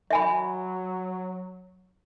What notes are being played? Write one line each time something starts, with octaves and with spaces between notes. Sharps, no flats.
F#3 E5 G#5 B5